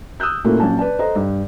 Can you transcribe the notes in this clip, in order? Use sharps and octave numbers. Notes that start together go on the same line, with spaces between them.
D#6 E6 F#6 G6
A#2 A3 A#3 C#4 E4 F#4
A#1 F#3 C#4 A5
B4 D5 A5
A4 C5 D#5 A#5
G2